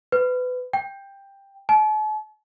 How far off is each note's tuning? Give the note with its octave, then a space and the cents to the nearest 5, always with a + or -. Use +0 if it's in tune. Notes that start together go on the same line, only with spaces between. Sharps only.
B4 +25
G5 +10
A5 -45